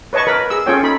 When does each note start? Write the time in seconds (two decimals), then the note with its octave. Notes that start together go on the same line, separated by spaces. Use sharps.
0.13 B4 C#5 D#5 A5 C#6
0.27 A#4 B4 B5
0.50 G#4 E6
0.66 C#4 F4 G#4 A4 C#5 G5
0.83 D#4 A4 B5